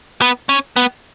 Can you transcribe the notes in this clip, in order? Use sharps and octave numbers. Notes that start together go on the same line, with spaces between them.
B3
C#4
B3